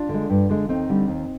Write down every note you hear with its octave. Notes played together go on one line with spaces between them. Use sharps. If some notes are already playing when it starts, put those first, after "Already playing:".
Already playing: D4 F4
D3 G#3
G2
D3 G#3
D#2 C4 D#4
D3 G3
D#2